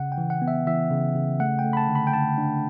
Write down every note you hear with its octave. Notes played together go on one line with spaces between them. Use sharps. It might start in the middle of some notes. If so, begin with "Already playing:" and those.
Already playing: C#3 F#5
G5
E3
F#5
B3
E5
E3 E5
C#3
C#3
A3 F#5
G5
A3
B5
A5
D3
B5
G5
D3 A5
D4